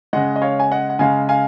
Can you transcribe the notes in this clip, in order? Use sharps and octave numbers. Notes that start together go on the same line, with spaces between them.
C#3 G#3 D#5 F#5
D#5
C#5 F5
G#5
D#5 F#5
F#5
C#3 G#3 F5 G#5
F5 G#5